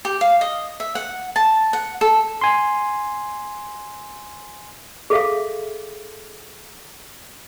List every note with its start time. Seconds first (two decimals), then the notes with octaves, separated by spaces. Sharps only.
0.05 G4
0.21 F5
0.41 D#5
0.80 E5
0.95 F#5
1.36 A5
1.73 F#5
2.01 A4
2.41 G#5 C6
5.10 G#4 A4 E5 F5